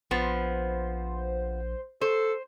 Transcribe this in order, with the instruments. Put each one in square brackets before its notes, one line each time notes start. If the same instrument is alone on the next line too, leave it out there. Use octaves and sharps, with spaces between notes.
[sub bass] A#1 [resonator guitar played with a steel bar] F3 B3 [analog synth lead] C5
[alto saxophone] A4 [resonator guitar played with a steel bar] C5